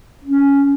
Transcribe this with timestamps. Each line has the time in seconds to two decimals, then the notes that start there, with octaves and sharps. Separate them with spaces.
0.24 C#4